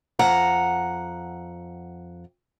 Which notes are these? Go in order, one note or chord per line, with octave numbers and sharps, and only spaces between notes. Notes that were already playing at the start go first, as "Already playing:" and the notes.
F2 F#5 A#5